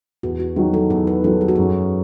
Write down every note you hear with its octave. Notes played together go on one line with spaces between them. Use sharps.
E2 F#4
F#4
D#3 F#3 G#4
A4
E2 B4
B4
D#3 F#3 A4
G#4
F#4
F#2 G#4